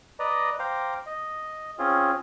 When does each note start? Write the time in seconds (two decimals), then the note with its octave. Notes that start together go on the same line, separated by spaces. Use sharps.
0.19 B4 D5 D#5 A#5
0.59 C5 F5 G5 A#5 D6
1.06 D#5
1.79 C4 C#4 F4 G#4